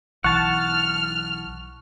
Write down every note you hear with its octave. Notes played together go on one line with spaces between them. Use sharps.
B1 E3 F#5 A5 C#6 F6